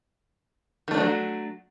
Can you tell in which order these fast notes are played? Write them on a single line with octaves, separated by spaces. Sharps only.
D#3 A3 D4 F3 F#3